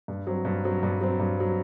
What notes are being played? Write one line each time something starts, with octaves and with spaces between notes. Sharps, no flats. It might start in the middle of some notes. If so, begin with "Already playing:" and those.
G2
F#3 C4
G2
F#3 C4
G2
F#3 C4
G2
F#3 C4